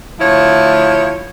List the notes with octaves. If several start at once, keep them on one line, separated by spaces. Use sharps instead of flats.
D2 F3 E4 C#5